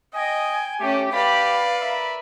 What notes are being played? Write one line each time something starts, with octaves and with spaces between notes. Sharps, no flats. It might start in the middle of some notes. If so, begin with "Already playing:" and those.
D#5 G5 G#5
A3 C#4 G4
G4 B4 D5 F5 B5
A#4 E5 B5